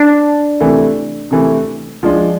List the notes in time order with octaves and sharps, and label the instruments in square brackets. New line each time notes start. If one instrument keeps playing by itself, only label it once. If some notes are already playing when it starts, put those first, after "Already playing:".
Already playing: [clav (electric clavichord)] D4
[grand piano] C3 E3 A3 E4
C3 E3 A3 E4
F3 G#3 D4